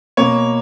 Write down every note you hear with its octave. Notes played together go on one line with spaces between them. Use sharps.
B2 A#3 C#5